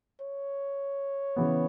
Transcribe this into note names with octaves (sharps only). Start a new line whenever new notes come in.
C#5
C#3 E3 B3